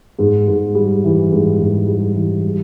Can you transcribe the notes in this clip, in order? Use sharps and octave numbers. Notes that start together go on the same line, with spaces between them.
G#2
G#2
G3
E3
G#2
G#2
G3
E3
G3